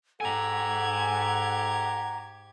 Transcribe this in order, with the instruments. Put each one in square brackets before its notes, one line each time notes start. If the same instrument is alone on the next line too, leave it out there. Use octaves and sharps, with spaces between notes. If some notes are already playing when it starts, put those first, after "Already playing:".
[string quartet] G#2 G4 G#6 [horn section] A4 [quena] F#5 [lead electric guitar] G#5 A#5